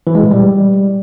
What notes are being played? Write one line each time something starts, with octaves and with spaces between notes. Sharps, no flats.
E3
G#3
A#2
G3